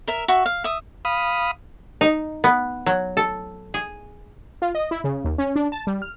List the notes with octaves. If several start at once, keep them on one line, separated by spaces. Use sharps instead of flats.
A#4 E5
F#4 E5 C#6
F5
E5 D#6
F5 B5 D#6
D#4
B3
F#3
A4
G#4
F4
D#5
E4
C#3
D#2
C#4
D4
A5
G3
F6